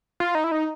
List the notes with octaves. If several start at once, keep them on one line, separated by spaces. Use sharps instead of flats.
F4
D#4
E4
D#4